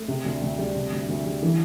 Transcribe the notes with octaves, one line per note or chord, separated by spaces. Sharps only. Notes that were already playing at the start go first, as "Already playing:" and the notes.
Already playing: A3
C3
D2
D2
G3
C3
D2
D2
G3
E3